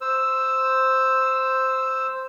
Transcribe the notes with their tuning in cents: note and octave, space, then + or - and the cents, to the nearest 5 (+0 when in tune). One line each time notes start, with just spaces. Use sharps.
C5 +0 E6 +0